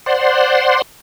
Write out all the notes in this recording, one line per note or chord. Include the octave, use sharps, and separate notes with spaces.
C5 D5 F#5 C6